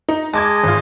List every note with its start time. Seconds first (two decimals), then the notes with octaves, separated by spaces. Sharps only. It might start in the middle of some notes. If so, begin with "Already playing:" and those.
0.09 D#4
0.34 G#3 D#5 A5 D6 G#6
0.64 G#1 F4